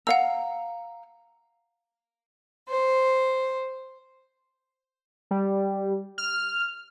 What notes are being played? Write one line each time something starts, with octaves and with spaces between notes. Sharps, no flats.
F5 F#5 A#5 E6
C5
G3
F6